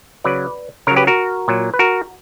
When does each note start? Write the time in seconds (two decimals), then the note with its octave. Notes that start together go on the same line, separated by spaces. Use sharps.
0.24 C#3 F#3 B4 D5
0.87 C#3 F#3 A#4 C#5
0.96 G4 B4
1.07 F#4 A#4
1.48 A#2 F#3
1.74 B4
1.79 F#4 A#4